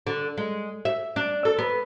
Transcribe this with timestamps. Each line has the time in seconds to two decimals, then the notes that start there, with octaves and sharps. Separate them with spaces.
0.07 D3
0.37 G#3
0.85 E5
1.16 D4
1.45 A4
1.58 B3